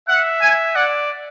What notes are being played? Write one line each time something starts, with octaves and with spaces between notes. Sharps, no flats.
E5 F#5
G#5
D5 F#5